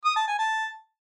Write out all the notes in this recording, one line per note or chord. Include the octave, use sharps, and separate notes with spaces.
D#6
A5
G#5
A5